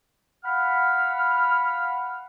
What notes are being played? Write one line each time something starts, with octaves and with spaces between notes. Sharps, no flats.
F5 F#5 B5 F6